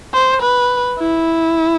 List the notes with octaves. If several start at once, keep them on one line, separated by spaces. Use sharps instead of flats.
C5
B4
E4